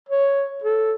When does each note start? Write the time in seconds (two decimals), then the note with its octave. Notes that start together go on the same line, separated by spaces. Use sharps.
0.09 C#5
0.64 A4